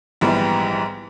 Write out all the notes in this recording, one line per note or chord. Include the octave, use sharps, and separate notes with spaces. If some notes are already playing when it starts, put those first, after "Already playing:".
A#1 G#2 E3 G3 B3